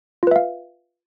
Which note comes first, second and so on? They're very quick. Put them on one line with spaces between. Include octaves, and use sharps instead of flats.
F4 B4 E5 F5